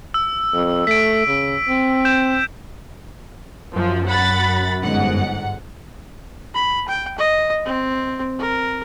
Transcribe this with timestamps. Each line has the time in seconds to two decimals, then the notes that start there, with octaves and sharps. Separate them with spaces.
0.14 E6
0.53 F2
0.87 A3 B6 D7
1.27 C#3
1.69 C4
2.05 G6 E7
3.76 F#2 F3
4.08 F#5 B5 A6
4.82 G1 G#2 F#5
6.54 B5
6.88 G5
7.18 D#5
7.65 C4
8.39 A#4